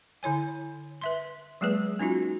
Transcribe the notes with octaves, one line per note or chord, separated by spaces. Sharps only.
D3 E4 C#5 G#5
B4 E5 C6
F#3 G#3 A#3 G#4 B4
C#4 D#4 F4 F#4